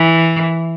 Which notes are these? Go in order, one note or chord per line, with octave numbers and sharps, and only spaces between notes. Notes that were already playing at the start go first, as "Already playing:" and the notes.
Already playing: E3